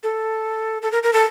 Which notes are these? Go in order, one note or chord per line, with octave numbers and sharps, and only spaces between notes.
A4
A4
A#4
A#4
A4